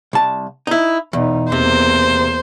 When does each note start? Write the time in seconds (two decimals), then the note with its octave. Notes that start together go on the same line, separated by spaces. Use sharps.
0.13 C2 A5
0.67 D#4 E4
1.13 E2 B2 D#4
1.52 E2 C3 A#3 C5